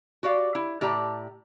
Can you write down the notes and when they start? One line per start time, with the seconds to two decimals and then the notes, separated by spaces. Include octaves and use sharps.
0.23 F#4 G4 D5 F5
0.55 E4
0.81 A2 G4 D5 A5 A#5